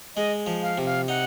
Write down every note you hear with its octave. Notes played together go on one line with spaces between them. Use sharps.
G#3 D#5
F3
F5
C3
F5
D#4 F#5